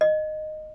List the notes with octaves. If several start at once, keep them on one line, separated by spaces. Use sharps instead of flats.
D#5